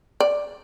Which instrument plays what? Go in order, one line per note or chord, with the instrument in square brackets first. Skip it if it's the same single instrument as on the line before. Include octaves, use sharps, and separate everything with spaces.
[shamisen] D5